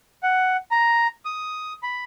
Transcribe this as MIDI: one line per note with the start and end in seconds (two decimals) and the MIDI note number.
0.23 0.57 78
0.71 1.07 82
1.25 1.73 87
1.83 2.04 83